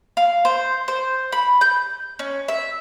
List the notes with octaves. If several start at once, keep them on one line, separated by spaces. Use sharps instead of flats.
F5
C5
C5
B5
G6
C#4
E5